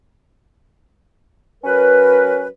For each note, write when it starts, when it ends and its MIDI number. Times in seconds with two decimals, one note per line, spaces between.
1.64 2.46 54
1.64 2.46 61
1.64 2.46 70
1.64 2.46 71